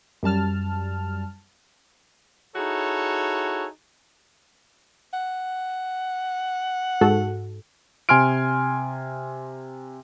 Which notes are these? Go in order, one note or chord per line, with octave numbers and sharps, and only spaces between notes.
F#2 G3 A5 F6
D#4 E4 F#4 G#4 A4 C#5
F#5
G#2 F#4 A4
C3 G#5 C6 F6 D7